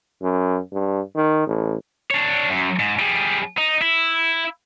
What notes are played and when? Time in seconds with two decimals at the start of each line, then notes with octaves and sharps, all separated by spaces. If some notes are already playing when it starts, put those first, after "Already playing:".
0.23 F#2
0.72 G2
1.15 D#3
1.47 A1
2.11 D4 C#5
2.49 F#2
2.79 G#2
2.99 G3 G#4
3.58 D#4
3.82 E4